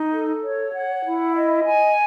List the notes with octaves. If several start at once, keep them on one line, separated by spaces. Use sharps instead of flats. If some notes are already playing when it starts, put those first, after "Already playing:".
Already playing: D#4
A4
C#5
F#5
E4
D#5
G#5